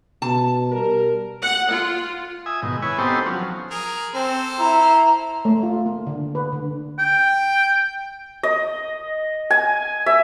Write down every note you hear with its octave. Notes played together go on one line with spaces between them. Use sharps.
B2 A5
G3 A#4
F#5
F4
E5 G#5 D#6
G#2 B2 D#3
E4 B4 C#5 G#5
B3 C4 D#4 G4 A4 C5
F3 F#3 C#4
G#4 A#4
C4 A4 C5
E4 A#5
A3
F4
A#3
D3
B4
D3
G5
D#5
G#5
E5